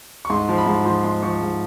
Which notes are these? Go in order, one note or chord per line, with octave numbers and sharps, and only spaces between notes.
C#6
G#2 C6
F3
B5
G#2
F3 C6
G#2 C6
F3 C#6
G#2